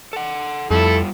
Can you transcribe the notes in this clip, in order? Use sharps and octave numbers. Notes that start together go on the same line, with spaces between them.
A4 F#5
F2 G3 A3 E4 F4 A4